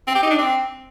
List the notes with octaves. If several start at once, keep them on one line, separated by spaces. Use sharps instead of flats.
C4
G4
D#4
D4
C4